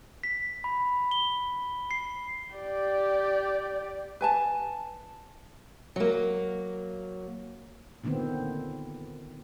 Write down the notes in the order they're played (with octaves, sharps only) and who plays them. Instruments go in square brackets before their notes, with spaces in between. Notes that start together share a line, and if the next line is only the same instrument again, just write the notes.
[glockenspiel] B6
B5
G7
C7
[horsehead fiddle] G4 D5
[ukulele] B4 G#5 A5
[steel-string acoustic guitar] F#3 A#3
[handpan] A#2 D3 D#3 B3 C4